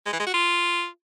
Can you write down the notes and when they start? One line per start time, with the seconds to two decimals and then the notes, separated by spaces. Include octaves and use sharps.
0.06 G#3
0.13 E3
0.20 G#3
0.26 F#4
0.33 F4